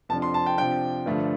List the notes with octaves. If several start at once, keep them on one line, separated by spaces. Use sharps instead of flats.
F2 C3 F3 D4 A5
C6
A5
G5
C3 F3 D4 G5
G2 D3 F3 A3